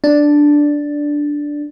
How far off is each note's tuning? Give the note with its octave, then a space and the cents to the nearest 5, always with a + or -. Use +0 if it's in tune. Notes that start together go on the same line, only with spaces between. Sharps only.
D4 +0